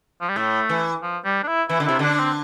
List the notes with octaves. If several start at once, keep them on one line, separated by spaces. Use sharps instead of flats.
F3
G3
A2 A3
E3
F3
G3
D4
E4
E3 E4
D3
C3 E4
D3 D4
D4
C4